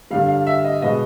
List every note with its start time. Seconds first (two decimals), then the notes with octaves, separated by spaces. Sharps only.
0.11 G2 D3 G3 F5
0.28 F5
0.47 E5
0.65 D#5
0.82 B2 G#3 B3 D#5